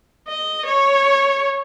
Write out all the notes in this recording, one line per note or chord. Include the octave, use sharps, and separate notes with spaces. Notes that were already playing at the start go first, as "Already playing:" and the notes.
D#5
C#5